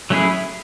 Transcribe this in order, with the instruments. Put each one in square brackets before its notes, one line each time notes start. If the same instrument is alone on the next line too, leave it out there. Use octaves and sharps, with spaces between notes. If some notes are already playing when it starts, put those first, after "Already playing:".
[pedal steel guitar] F#3 A3 C#4 E4 G#4